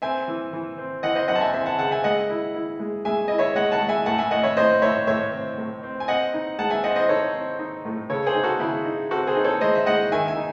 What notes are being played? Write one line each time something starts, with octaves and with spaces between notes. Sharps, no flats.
C4 E5 G#5
E3
E3
C4
E3 D#5 F#5
C5 D#5
F#2 D#5 F#5
A5
E5 G#5
C4 E5 G#5
F#5 A5
C#3 F#5 A5
E5 G#5
G#3 D#5 F#5
E4
E4
G#3
G#3 E5 G#5
E4 D#5
C#5 E5
G#3 D#5 F#5
F#5 A5
G#3
E5 G#5
A2 F#5 A5
E5 G#5
A2 D#5 F#5
C#5 E5
A2 C5 D#5
A2 C#5 E5
A2 C#5 E5
C4
A2
C4
G#5
C4 D#5 F#5
D#4
G#3 F#5 A5
E5 G#5
C4 D#5 F#5
C5 D#5
D#4 A4 C#5
C4
D#4
A2
C#3 A4 C#5
G#4 C5
D#4
F#4 A4
C#3 E4 G#4
D#4
C4 F#4 A4
G#4 C5
D#4
A4 C#5
G#3 C5 D#5
E5
G#3 D#5 F#5
D#3 E5 G#5
E5 G#5
D#4